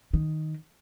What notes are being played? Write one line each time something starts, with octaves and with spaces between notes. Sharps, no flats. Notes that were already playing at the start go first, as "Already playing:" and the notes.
D#3